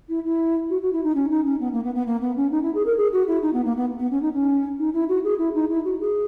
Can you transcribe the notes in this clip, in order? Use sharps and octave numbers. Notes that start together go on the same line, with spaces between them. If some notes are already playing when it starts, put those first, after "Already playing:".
E4
E4
F#4
F#4
E4
D#4
C#4
D#4
C#4
B3
A#3
B3
B3
A#3
B3
C#4
D#4
E4
G#4
A#4
G#4
F#4
E4
D#4
B3
A#3
B3
B3
C#4
D#4
C#4
D#4
E4
F#4
G#4
E4
D#4
E4
F#4
G#4